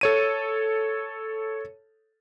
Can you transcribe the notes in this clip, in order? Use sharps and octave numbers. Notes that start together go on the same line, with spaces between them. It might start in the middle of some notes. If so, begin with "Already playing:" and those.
A4 C#5 D#7